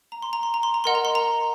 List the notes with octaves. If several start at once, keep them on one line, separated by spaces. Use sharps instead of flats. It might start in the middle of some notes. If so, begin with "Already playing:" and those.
A#5
C6
A#5
C6
A#5
C6
A#5
A#4 D#5 F#5 C6
A#5
C6
A#5